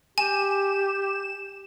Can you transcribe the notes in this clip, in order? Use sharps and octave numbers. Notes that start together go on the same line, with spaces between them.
G4 G#5 E7